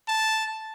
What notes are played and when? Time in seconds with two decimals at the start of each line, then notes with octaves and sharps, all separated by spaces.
0.08 A5